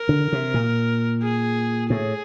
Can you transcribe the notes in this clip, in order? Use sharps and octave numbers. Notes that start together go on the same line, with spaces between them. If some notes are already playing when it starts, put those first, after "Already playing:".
Already playing: A#4
D3
C3
A#2
G#4
A2 G#4